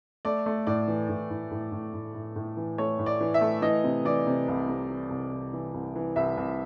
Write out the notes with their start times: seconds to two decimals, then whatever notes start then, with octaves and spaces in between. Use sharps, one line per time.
0.25 A3 D5
0.46 A3
0.67 A2 D5
0.88 E3
1.09 A2
1.31 A2
1.51 A2
1.72 A2
1.94 A2
2.15 A2
2.36 A2
2.57 E3
2.78 A3 C#5
2.99 A2
3.06 D5
3.21 E3
3.34 E5
3.41 A3
3.62 E3 D#5
3.84 C3
4.05 E3 D5
4.26 C3
4.48 C2
4.69 C3
4.90 E3
5.10 C2
5.32 C2
5.53 E3
5.74 C2
5.95 E3
6.16 C2 E5
6.37 C2